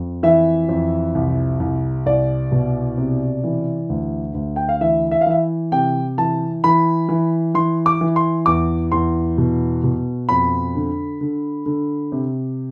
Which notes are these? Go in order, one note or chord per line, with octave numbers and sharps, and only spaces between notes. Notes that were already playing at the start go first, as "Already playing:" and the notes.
Already playing: F2
E3 E5
F2
C2
C2
C2 D5
B2
C3
E3
D2
D2
G5
F5
E3 E5
E5
F5
E3 E5
C3 G5
E3 A5
E3 B5
E3
E3 C6
D6
E3
C6
E2 D6
E2 C6
B2
B2
F2 B5
D3
D3
D3
C3